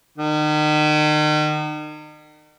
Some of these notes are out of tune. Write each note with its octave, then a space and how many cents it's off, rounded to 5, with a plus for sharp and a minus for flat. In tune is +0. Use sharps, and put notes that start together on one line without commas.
D#3 -40